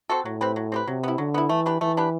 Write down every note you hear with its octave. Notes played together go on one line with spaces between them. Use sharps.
C4 F#4 A4
A2 F#3
C4 G4 B4
F#3
C4 G4 B4
C3 F#3
B3 E4
D3 F#3
B3 E4
E3 A3
D4 G4 B4
E3 A3
D4 G4 B4